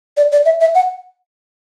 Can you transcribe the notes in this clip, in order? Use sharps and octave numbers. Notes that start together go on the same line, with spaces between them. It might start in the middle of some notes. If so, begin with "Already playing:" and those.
D5
D5
E5
E5
F#5